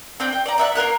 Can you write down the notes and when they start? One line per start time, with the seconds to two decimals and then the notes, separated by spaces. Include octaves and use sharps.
0.20 C4 D4 G5
0.33 G5
0.46 D5 A#5
0.58 D5 E5 F#5
0.75 A#3 F4 A#4 F#6